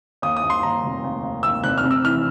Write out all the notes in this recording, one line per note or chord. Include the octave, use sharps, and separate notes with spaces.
D#2 D#6
D#6
D#2
C6
D#2 A#5
F1
D#2
D#2
D#2 E6
F1 F#6
F6
C3
E6
E3 F6